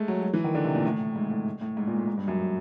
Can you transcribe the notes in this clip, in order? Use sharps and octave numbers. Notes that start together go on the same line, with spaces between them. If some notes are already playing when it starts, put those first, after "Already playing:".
Already playing: G#3 A3
F#3
F#3
E3
D#3
D3
C3
A#2
A2
G#2
A2
A2
G#2
A#2
A2
G#2
G2
F#2